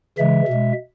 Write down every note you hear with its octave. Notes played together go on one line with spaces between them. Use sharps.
C#3 E3 G#3 E5
B2 G#3